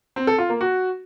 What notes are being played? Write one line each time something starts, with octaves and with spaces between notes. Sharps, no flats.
C4
A4
F4
A#3
F#4